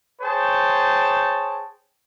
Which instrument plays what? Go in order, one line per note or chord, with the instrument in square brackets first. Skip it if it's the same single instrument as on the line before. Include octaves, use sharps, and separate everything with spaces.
[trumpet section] G#4 C5 C#5 G5 A5